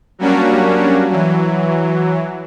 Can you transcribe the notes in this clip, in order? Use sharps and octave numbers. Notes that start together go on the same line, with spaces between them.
F#3 G3 A#3 C#4 D4 F#4
E3 F#3